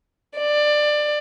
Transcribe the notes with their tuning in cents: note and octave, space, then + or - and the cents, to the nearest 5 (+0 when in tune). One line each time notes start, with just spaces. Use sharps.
D5 +20